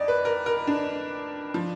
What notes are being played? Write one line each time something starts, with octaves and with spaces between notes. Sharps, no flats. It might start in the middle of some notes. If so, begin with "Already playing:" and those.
Already playing: F2 D5 D#5
B4
A#4
A#4
D4
F3